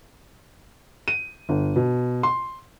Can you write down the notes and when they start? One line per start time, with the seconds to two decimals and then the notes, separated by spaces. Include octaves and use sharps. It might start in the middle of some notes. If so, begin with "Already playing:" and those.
1.08 D#7
1.49 G1
1.76 B2
2.23 C6